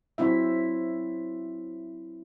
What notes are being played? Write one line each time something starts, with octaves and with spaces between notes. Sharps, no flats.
F#3 C4 E4 E5